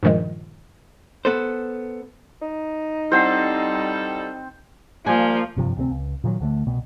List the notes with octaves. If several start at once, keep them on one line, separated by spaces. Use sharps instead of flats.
G2 A#2 D#3 F3 G#3
B3 A4 C5
D#4
G3 C4 E4 A4 C5 F#5 C7
F3 G3 A#3 G#5
F#1 G2 C3 F3
D2 C3 F#3 C4
C#2
A#2 D#3 E3 F#3
D2 D3 G#3 A3
C2 B2 B3